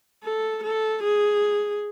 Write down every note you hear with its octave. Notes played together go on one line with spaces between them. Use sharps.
A4
A4
G#4